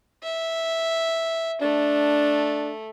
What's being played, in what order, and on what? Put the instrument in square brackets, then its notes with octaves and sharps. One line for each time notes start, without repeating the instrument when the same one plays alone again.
[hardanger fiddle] E5
[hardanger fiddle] A3 [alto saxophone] D4